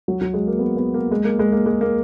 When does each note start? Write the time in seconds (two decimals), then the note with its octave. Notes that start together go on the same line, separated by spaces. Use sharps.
0.08 F#3
0.21 F#3
0.34 G#3
0.47 A#3
0.59 B3
0.77 B3
0.94 A#3
1.11 G#3
1.25 A#3
1.39 G#3
1.52 A#3
1.66 G#3
1.81 A#3